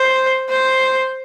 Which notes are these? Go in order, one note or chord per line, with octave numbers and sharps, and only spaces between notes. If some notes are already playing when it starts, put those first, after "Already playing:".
Already playing: C5
C5